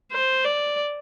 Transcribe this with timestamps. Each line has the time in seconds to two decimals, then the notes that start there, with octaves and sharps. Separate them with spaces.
0.11 C5
0.44 D5